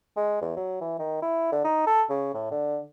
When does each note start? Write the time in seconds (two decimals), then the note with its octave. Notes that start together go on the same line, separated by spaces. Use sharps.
0.17 G#3
0.42 E2
0.56 F#3
0.81 E3
0.99 D#3
1.22 E4
1.52 D3
1.64 D#4
1.87 A4
2.10 C#3
2.34 A2
2.51 D3